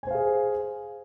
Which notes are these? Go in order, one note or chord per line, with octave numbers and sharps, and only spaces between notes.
G#4 C5 F5 G#5